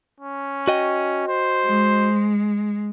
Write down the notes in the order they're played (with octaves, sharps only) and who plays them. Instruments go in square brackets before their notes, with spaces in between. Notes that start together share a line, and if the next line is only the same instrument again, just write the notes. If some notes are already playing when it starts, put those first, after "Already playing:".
[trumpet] C#4
[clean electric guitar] F#4 D#5 G5
[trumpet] C5
[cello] G#3